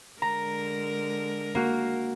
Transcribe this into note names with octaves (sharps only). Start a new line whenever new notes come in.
D3 G#3 A#4 A#5
A#3 F#4